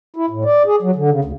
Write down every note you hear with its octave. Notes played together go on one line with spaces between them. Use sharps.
E4
A2
D5
G#4
F#3
D3
C#3
D2